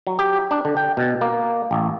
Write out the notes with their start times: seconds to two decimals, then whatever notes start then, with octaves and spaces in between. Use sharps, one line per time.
0.07 F#3
0.19 G4
0.51 D4
0.65 D3
0.77 G5
0.97 B2
1.21 A#3
1.71 A1